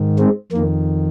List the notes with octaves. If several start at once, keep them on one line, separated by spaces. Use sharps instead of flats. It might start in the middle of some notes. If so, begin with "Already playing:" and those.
Already playing: G#2 D#3
G#3 C4
F2 D#3 A#3